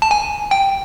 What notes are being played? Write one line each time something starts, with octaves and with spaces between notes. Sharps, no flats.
A5
G#5
G5